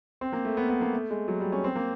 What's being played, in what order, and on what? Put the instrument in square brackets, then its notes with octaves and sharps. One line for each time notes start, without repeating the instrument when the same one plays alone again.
[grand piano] C4
A#3
A3
B3
B3
A#3
A3
G#3
F#3
G3
C#4
C4
A#3